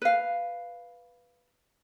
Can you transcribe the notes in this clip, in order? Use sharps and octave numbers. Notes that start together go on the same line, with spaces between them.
B4 F5